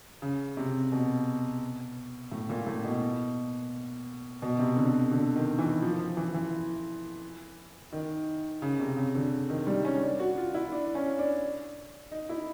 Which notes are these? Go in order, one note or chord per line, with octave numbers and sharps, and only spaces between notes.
C#3
C3
B2
A2
A#2
A2
B2
B2
C3
D3
D3
D#3
E3
F3
F3
E3
E3
D#3
C#3
C3
C#3
D3
D#3
G3
C#4
D4
F#4
F4
E4
D4
C#4
D4
D#4
E4